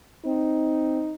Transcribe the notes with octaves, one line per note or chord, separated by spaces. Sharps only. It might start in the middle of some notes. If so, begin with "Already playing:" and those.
C4 D#4